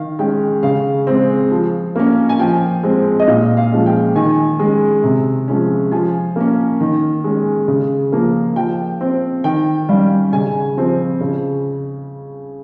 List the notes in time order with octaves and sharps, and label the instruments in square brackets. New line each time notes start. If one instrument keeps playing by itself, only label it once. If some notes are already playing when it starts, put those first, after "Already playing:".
Already playing: [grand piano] D#3 F5
G#3 C#4 G5
C#3 F5
G#3 C4
F3
A#3 C#4
G#5
F3 G5
G#3 C4
D#5
A#2 F5
F5
F3 G#3 C#4
G5
D#3 G#5
G#3 C#4
C3
F3 G#3 C#4
F3 G#5
A#3 C#4
D#3
G#3 C#4
C#3
F3 A#3
F3 G5
C4
D#3 G5
G3 C#4 F5
C#3 G#5
F3 C4
C#3